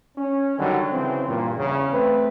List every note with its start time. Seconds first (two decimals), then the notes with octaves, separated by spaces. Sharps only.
0.18 C#4
0.58 D3 D#3 F#3 G3
0.92 C#3 E3 C4
1.27 G2 A#2
1.57 E2 C#3
1.92 A3 C4 B4